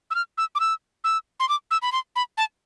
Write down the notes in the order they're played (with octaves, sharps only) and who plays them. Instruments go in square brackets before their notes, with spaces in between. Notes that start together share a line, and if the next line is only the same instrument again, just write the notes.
[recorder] E6
F6
E6
D6
E6
E6
C6
D6
E6
B5
C6
B5
A5